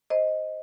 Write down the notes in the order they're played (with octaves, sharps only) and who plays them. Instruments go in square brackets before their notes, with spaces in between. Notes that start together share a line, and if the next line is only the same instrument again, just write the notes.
[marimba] C5 D#5